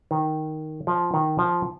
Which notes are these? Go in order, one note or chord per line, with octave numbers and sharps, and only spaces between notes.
D#3
F3
D#3
F3